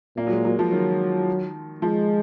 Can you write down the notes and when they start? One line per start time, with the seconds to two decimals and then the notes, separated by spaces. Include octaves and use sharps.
0.17 A#2 A#3
0.27 F#3
0.31 G#3
0.45 F#3
0.59 F3
0.72 D#3 F#3
1.82 F3 G#3